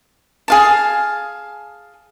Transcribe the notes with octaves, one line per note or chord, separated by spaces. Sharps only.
G#4 F5 A5